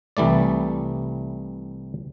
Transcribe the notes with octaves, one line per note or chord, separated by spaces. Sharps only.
C2 E3 G3 A3 D5